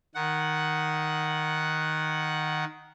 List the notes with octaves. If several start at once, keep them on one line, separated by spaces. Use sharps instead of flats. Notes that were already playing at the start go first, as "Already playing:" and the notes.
D#3 F#5